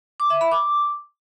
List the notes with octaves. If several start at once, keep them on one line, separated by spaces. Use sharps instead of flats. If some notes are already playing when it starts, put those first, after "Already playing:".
D6
E5
B5
D6